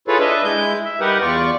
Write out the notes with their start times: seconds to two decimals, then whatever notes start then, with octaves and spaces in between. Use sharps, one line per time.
0.08 E4 F4 G#4 A4 B4 C#5
0.20 D4 B4 D#5 E5
0.44 G#3 E4 G6
0.85 E5
1.00 G3 D#4 G4 A#4 B4 F#5
1.22 E2 F4 D5 C#6